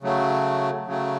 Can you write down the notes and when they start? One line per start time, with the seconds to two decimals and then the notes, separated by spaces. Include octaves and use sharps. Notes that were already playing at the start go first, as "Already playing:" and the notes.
0.01 C#3 F#3 A3
0.87 C#3 F#3 A3